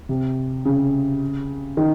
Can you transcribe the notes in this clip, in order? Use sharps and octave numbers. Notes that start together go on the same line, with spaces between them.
C3
C#3
D#3